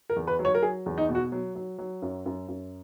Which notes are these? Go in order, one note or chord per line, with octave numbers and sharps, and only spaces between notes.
A#4
E2
B4
F#3
C#5
A#4
F#3 G#4
E2
D#4
B2
F#4
F#3
F#3
F#3
F#2
F#2
F#2